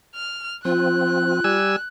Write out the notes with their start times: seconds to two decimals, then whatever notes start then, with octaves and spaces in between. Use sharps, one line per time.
0.15 F6
0.65 F3 C4 F4 F#6
1.44 G3 G#5 E6